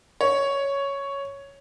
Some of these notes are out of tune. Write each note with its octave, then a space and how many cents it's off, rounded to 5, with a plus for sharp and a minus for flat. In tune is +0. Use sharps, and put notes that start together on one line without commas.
C#5 +5